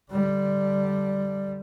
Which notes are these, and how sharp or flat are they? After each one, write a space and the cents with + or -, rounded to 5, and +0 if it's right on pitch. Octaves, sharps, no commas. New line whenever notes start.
D3 +5 G3 +0